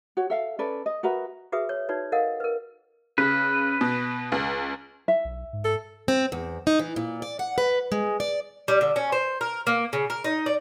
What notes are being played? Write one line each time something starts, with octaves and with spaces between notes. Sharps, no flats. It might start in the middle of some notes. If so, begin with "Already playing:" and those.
F#4 C#5
A4 E5 F5
C#4 A4 B4 D5
D#5
F#4 A#4 B4 E5
F#4 G#4 B4 E5 D#6
C#5
D#4 F#4 B4 C#5 D5
A4 A#4 D#5 F5 F#5
A#4 B4
C#3 B4
B2
C#2
E5
B1
G#2
A4
C4
E2
D#4
E3
A#2
D5
F#5
B4
G#3
D5
G3
D3
C#4
C5
A#4
A#3
C#3
A#4
D#4
D5